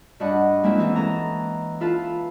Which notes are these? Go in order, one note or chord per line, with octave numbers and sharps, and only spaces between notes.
G2 D4 F#4 D#5 F#5 B5
G#3 A#3 C4 C#4 E4 F#4
E3 D#4 E5
C#4 A4 A#5
E4 F4 A4 B4